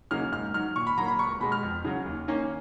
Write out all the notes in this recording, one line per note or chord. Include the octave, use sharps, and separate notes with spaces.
C#3 F#3 A#3 D#4 F6
G#2 F6
D#3 F#3 F6
A#2 C#6
B5
F#3 A#3 A#5
B5
C#2 C#6
B2 G#3 B5
F6
F2
C#3 F#3
D#2
D#3 A#3 C#4